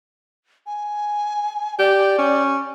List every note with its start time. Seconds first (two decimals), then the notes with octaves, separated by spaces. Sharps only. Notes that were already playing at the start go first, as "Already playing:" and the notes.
0.66 G#5
1.79 G4 D5
2.18 C#4